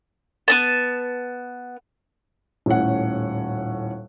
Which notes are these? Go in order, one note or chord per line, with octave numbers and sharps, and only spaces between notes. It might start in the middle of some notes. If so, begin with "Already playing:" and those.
B3 C4 A5
D#1 A2 C#4 F#5